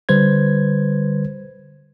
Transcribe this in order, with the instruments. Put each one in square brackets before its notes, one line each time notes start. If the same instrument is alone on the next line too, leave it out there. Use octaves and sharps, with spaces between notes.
[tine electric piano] D3 G3 B4 C5 G#6